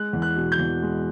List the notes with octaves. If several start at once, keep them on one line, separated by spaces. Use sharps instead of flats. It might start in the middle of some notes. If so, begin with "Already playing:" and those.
Already playing: G#3 F#6
E2
F#6
B2
G6
E2
G#3